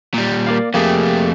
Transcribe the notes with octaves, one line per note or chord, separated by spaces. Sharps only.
A#2 G3
A#3 D5 F5
F2 A3 A#3 G4 G#4